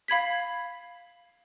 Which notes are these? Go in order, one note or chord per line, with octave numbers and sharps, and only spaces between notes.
F5 B5 G#6 B6